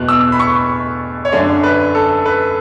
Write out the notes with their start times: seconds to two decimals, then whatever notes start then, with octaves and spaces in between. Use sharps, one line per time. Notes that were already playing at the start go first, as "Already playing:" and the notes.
Already playing: E2 B2 F#6
0.08 E6
0.32 B5
0.39 C#6
1.25 C#5
1.32 F#2 D3 D5
1.64 B4
1.95 A4
2.26 B4